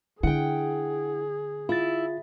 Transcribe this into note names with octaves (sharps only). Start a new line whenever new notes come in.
D3 E4 G#4 F#5 G5
E4 F4 A6